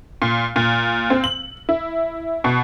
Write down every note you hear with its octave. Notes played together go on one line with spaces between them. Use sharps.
A#2
A#2
C4
F#7
E4
B2